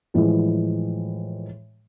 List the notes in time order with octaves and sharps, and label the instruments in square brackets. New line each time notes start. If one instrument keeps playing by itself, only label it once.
[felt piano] A2 E3 F3 G#3